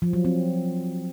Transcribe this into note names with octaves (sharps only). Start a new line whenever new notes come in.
F3
F#3
C4